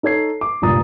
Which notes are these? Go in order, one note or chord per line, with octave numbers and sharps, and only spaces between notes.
D#4 A4 C#5 G#6 C7
D6
F1 G2 A#2 A#5 D#6 A6